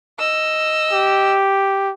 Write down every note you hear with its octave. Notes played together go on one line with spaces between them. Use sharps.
D#5 E6
G4